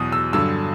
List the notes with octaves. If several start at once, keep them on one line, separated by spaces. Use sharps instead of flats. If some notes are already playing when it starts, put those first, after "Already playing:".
Already playing: E2 B2 F#3 D#6
E6
G2 D3 F#3 E6